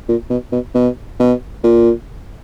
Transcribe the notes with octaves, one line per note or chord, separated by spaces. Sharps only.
A#2
B2
B2
B2
B2
A#2